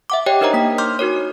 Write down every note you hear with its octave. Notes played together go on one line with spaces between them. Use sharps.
E5 F#5 D6
G4 C#5 D#5 G5
D4 D#4 A#4 C5 D#5 A#5
A#3 B6
C6 D6 F6 G6
D#4 F#4 A#4 C#5